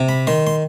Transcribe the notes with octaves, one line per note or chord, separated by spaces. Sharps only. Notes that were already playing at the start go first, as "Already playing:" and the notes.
Already playing: C3
B5
D#3 C6
C6